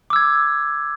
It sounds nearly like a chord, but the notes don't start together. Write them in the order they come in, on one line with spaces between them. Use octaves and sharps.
D6 E6 G#6